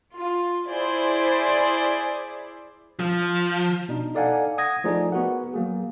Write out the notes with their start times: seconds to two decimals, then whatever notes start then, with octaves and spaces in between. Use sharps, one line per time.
0.15 F4
0.68 E4 G#4 C5 D5
3.00 F3
3.89 B2 D4 D#4
4.14 D#4 A4 D5 F5 F#5 G#5
4.58 F#5 D#6 G#6 A#6
4.84 F3 A3 D#4 G#4 D5
5.12 B3 F#4 A#4 F#5
5.54 F#3 A#3 G#4